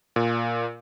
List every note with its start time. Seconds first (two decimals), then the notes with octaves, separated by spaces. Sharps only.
0.16 A#2